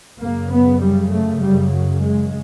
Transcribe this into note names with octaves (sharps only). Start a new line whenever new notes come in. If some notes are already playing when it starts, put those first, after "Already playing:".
F#2 C#3 A#3
B3
G3
A3
G3
F#3
G#3